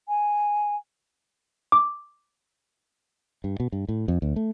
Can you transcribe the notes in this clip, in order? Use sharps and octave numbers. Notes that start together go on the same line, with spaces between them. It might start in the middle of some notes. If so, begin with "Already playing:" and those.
G#5
D6
G2
B2
G2
A2
F2
D2
A3